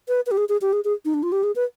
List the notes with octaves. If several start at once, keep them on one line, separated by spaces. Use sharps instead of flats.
B4
B4
G4
G#4
G#4
G4
G#4
G#4
D#4
D4
F4
G4
G#4
B4